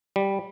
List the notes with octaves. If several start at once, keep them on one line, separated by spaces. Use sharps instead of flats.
G3